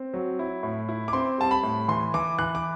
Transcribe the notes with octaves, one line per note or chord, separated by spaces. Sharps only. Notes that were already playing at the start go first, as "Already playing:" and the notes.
Already playing: C4
F#3
E4
A2
E4
D6
C4 C6
G3 A5
B5
A2
E3 C6
E3 D6
E3 F#6
D6